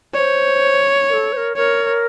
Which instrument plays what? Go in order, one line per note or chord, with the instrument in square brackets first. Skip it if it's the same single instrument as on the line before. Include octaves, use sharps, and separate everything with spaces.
[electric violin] C#5 [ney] D5
[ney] C5
A#4
A4
C5
A#4
[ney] A#4 [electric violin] C#5